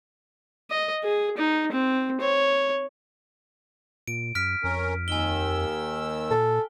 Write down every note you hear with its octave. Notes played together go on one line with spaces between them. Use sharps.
D#5
G#4
D#4
C4
C#5
A#2 D7
F#2 F6 B6 D7
F2 C#4 A#4
D#2 D#3 G#5 E6 G7
A#2 A4